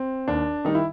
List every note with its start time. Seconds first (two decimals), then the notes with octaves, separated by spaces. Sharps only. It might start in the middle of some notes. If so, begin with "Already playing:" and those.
Already playing: C4
0.28 D#2 D4
0.65 D#3 G3 D#4
0.75 E4